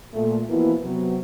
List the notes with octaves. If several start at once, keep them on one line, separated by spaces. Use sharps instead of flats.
A#2 A3
B2 E3 F3 A#3 B3 E4
C3 F#3 B3